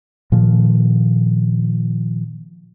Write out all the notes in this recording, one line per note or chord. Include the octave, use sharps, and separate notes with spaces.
A#2 D#3 F3